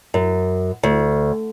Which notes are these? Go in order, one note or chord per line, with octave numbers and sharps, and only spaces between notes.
F#2
D2